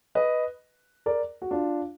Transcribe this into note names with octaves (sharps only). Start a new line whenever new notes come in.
B4 D#5
A#4 D5
F#4
D4 F4